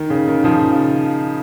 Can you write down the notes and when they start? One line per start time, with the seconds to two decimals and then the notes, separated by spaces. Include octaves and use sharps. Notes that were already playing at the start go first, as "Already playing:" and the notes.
Already playing: D#3
0.10 C#3
0.27 D#3
0.44 C#3 F3